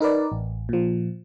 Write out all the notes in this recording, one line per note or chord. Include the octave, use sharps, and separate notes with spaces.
D#4 A#4 B4 D5
A1
A#2 F3